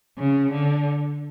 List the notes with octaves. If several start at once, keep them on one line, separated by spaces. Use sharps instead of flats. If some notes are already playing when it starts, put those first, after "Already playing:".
C#3
D3